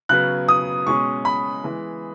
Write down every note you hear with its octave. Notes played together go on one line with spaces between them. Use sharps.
C#3 F#3 B3 F#6
D#6
B2 G#3 C#4 C#6
B5
E3 G#3 B3